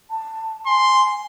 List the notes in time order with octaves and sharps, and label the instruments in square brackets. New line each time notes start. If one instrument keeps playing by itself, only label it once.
[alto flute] A5
[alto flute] G#5 [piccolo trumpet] C6